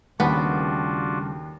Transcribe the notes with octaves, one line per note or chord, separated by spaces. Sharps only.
D#2 C#3 G3 A3 B3 D4 F4 F#4